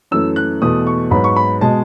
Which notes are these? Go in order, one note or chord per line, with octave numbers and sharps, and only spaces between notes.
F#2 E3 A3 E6
F#6
E2 B2 A3 D#6
C#6
G#2 F#3 B3 B5
C#6
B5
B2 G#3 A5